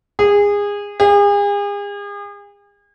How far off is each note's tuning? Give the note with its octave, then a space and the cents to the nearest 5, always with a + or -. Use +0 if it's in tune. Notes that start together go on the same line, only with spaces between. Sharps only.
G#4 -25
G#4 -40